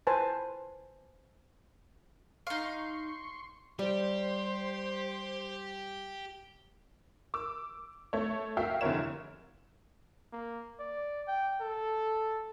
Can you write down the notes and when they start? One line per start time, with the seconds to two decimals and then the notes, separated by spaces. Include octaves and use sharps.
0.07 B4 C5 G#5 A5
2.47 D#4 F5 C6 C#6
3.79 G3 G4 C5
7.34 D6 E6
8.13 A3 C#5
8.57 F#4 E5 F5 G5
8.81 F1 D3 E4 A#4 C#5 E7
10.33 A#3
10.80 D5
11.28 G5
11.61 A4